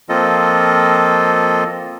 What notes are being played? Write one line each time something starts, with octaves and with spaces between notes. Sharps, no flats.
F3 A#3 C4 F4 A4 D#5